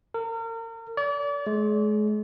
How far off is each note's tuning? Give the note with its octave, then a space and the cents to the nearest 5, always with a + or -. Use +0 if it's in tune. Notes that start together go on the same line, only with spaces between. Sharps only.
A#4 -35
D5 -35
G#3 +35